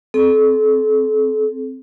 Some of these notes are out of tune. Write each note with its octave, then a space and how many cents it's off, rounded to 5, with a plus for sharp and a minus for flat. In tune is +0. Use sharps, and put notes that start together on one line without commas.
C4 +0 A4 -35